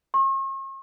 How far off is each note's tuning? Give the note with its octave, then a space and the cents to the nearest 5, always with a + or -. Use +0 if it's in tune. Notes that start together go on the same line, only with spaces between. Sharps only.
C#6 -45